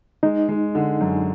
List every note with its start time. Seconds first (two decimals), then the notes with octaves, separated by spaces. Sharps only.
0.23 G#3 D#4
0.49 G#3
0.75 D3
1.01 F#2